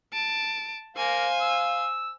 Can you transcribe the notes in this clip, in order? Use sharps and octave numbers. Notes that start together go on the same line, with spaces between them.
A5 D7
A#3 C5 F5 G#5
E6